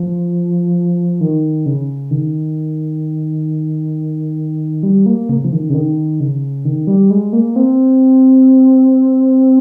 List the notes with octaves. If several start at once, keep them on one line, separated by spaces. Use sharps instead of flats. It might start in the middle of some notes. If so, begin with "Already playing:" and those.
Already playing: F3
D#3
C#3
D#3
G3
A#3
C#3
F3
D#3
C#3
D#3
C#3
D#3
G3
G#3
A#3
C4